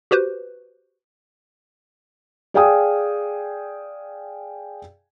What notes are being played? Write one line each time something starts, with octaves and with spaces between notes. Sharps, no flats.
F#4 G4 B4 C5
G#4 D5 F5 G5 G#5 D#6